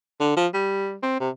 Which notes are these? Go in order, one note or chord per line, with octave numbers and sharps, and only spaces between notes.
D3
F3
G3
C4
C3